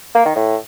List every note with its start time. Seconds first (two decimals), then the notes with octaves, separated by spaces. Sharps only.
0.15 A#3
0.25 D#3
0.36 A2